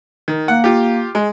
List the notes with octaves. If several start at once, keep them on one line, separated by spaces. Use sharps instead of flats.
D#3
A#3 F#5
F4 G4
G#3